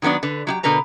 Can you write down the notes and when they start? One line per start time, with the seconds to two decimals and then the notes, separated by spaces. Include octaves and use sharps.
0.02 D#3 F#3 B3 D4 D5
0.23 D3 B4
0.47 F#3 E4 G4
0.63 B2 D3 A#4 B4 A#5